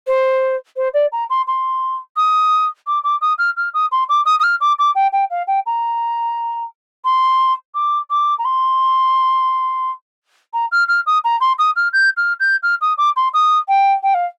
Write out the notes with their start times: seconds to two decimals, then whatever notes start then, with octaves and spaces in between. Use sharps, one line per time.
0.07 C5
0.76 C5
0.94 D5
1.12 A#5
1.30 C6
1.47 C6
2.17 D#6
2.87 D6
3.04 D6
3.21 D#6
3.38 F6
3.57 F6
3.74 D#6
3.92 C6
4.09 D6
4.26 D#6
4.40 D#6
4.43 F6
4.61 D6
4.79 D6
4.95 G5
5.13 G5
5.30 F5
5.47 G5
5.66 A#5
7.05 C6
7.75 D6
8.10 D6
8.39 A#5
8.45 C6
10.54 A#5
10.72 F6
10.88 F6
11.06 D#6
11.24 A#5
11.41 C6
11.59 D#6
11.76 F6
11.93 G6
12.17 F6
12.40 G6
12.63 F6
12.81 D#6
12.98 D6
13.16 C6
13.34 D#6
13.68 G5
14.03 G5
14.14 F5